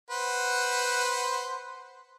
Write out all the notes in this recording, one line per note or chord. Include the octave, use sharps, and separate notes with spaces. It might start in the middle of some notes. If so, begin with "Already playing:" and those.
B4 C5 F#5